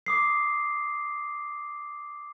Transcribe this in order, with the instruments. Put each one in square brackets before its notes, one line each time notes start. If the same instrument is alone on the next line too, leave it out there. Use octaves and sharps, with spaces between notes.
[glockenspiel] D6 D#6 C7